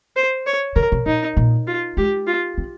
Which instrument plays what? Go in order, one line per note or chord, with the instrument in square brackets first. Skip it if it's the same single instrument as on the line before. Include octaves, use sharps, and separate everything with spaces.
[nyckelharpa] C5
C#5
[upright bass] C#3 [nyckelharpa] A#4
[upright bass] C3
[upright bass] A#2 [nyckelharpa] D#4
[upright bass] A#2
[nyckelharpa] F4
[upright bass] G#3 [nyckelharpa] G4
[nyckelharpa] F4
[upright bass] C4